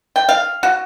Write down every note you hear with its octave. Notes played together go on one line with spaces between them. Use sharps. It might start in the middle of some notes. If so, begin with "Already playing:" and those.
G5
F5
F#4